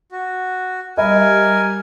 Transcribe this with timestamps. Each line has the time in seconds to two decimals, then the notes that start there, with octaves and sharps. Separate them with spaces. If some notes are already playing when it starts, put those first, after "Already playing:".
0.12 F#4
0.97 G3 A#4 D#5 E5 G#5 B5